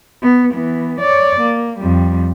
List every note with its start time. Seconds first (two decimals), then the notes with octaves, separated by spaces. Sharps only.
0.23 B3
0.53 E3 B3
1.01 C#5 D5
1.41 A#3
1.80 F2 G3